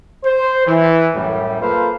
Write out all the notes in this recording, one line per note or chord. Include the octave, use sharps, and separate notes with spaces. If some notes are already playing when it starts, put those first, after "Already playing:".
C5
E3
F#2 A2 G3
A#3 F4 A4 B4 C5 F5